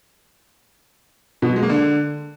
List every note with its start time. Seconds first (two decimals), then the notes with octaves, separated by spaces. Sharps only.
1.42 B2
1.49 F#3
1.56 G#3
1.63 A#3
1.70 D3